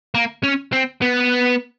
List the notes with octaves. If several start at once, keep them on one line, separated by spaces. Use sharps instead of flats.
A#3
C#4
C4
B3